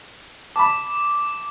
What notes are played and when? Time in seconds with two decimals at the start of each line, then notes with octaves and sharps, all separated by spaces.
0.56 A5 B5 D6